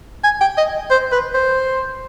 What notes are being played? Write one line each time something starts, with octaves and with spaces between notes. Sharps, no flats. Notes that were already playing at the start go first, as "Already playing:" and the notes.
G#5
G5
D#5
C5
B4
C5